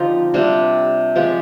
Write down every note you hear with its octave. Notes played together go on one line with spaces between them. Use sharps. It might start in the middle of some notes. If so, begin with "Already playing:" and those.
Already playing: D3 F3 C4 D#4 F4 G4
C3 G3 D4
F3 G#3 D4 G4